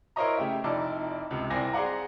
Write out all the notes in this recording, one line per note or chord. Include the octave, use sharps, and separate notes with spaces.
E4 A#4 C5 C#5 D#5 A#5
C#3 A3 G4 E5
F1 F2 D#4 E4 D5 A5
C#2 C3
C2 C4 E4 D5 G#5 A#6
G#4 C5 D5 F#5 A#5